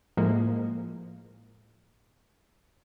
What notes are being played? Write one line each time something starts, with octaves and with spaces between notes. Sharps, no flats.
A2 F3 G#3 A#3